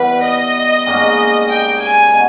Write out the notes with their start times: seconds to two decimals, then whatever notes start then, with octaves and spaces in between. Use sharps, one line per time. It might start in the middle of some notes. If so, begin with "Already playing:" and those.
Already playing: E3 G3 B3 B4
0.22 D#5
0.86 G#2 G3 A#3 C#4
1.50 G5
1.81 G#5
2.13 B2